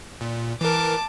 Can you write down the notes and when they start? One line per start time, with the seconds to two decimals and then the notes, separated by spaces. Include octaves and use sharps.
0.21 A#2
0.61 E3 A#4 A5 D6